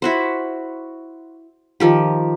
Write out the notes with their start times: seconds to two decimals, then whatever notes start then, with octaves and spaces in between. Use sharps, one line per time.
0.02 E4 F#4 C5
1.80 D#3 F3 G4